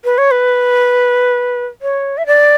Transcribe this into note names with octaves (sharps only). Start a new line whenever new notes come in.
B4
C#5
B4
C#5
E5
D5